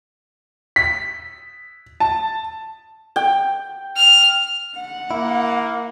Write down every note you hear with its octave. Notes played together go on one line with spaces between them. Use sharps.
B6
A5
G5
F6
F#5
A#3 E4